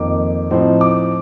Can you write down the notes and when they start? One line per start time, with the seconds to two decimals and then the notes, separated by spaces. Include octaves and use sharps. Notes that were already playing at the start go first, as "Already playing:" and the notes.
Already playing: F2 D#3 A#3 D#4 D6
0.50 A2 F3 C4 D#4
0.81 D6